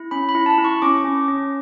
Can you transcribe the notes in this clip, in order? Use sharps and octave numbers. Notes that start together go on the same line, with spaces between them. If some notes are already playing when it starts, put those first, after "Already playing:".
Already playing: E4
C#4 B5
B5
E4
A5
E4
C#6
C#4 D6
C#4
C#4